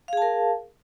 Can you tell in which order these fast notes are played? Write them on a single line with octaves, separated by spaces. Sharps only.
F5 G#4 A5 A#4